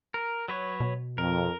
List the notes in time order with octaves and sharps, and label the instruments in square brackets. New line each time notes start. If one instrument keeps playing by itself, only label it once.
[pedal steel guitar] A#4
F#3 B4 C#5
[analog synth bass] B2
[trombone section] F2 [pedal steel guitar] A#4